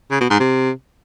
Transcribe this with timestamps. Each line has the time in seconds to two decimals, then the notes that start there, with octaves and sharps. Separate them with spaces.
0.11 C#3
0.20 B2
0.30 G#2
0.40 C3